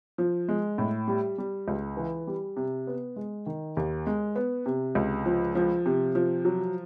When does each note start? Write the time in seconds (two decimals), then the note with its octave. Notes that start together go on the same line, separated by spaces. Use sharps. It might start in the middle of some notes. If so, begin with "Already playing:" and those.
0.18 F3
0.49 G#3
0.78 A2
1.08 G3
1.38 G3
1.68 C#2
1.97 E3
2.27 G3
2.57 C3
2.87 B3
3.16 G#3
3.46 D#3
3.77 D#2
4.07 G#3
4.36 B3
4.66 C3
4.95 C#2
5.25 F3
5.55 F3
5.86 C3
6.15 F3
6.45 F#3